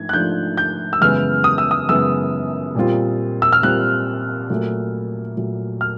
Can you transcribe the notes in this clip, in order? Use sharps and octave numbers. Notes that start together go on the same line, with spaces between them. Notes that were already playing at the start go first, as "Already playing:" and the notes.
Already playing: G#2 F3 A3 D4 G#6
F#6
G#2 F3 A3 D4 F4 G6
G6
E6
F#2 C#3 E3 G#3 B3 F6
D#6
E6
D#6
F#2 C#3 E3 G#3 B3 E6
A#2 G3 C4 F4
E6
F6
A#2 G3 C4 F4 F#6
A#2 F#3 A3
A#2 F#3 A3
F6